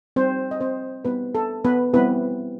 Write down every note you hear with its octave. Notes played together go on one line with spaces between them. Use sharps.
G3 C4 D#4 G4 C5
D#5
C4 C5
G3 B3 D#4 G4 B4
A4
B3 B4
G3 B3 C4 E4 G4 B4